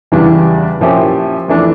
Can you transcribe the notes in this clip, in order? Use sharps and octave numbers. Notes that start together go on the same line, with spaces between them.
E2 C#3 E3 G3 D4
A#2 F3 C#4 E4 G4
F2 E3 A3 D4